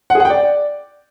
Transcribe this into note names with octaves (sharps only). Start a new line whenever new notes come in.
F#5
G#4
F#5
G5
D5